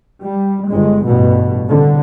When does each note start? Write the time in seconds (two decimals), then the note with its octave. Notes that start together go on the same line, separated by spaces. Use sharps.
0.21 G3
0.69 G1 G#3
1.05 A1 G2 B2
1.68 C2 D3